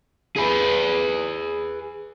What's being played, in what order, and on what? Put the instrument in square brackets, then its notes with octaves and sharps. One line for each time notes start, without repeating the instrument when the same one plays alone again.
[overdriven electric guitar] G#4 B4